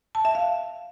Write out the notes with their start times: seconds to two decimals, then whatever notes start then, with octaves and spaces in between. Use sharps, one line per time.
0.15 A5
0.25 E5
0.35 F5